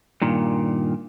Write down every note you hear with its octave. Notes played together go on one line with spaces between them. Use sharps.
G2 A#2 D#3